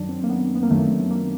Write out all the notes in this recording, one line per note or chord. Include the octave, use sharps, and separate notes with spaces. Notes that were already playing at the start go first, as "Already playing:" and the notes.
Already playing: F#2 D#3 F#3 D4
C4
A#3
B3
B3
A#3
F#2 D#3 F#3 A3
A3
A#3